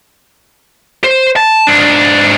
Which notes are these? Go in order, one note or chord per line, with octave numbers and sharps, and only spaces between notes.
C5
A5
G#2 D4